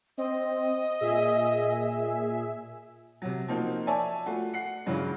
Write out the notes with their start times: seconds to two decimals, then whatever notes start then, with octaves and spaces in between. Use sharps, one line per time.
0.18 C4 D#5
1.00 A#2 G#4 E5
3.22 C3 F#3
3.48 F3 A#3 C4 D#4 F#4
3.87 C#5 D5 E5 G#5 A5
4.26 A3 F4 F#4
4.54 F#5 C7
4.86 G2 C#3 E3 F#3 G#3